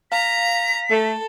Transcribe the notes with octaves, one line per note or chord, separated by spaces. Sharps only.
F5 A#5 B6
A3 A4